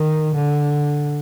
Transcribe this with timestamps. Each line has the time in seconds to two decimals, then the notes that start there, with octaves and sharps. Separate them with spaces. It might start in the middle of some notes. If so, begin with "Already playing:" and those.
Already playing: D#3
0.35 D3